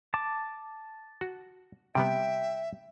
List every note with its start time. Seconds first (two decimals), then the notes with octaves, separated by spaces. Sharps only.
0.14 A5 D6
1.21 F#4
1.95 C3 G3 B3 E5 G5